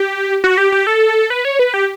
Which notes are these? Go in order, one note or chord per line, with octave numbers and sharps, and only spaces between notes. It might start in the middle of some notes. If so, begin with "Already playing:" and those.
Already playing: G4
F#4
G4
G4
A4
B4
C#5
B4
G4